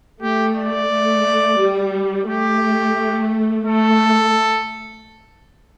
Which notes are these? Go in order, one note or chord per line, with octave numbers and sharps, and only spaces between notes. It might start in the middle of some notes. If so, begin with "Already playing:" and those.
A3 G4
D5
A3
G3
A3 G4
A3 A4